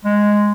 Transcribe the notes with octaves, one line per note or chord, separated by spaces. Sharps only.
G#3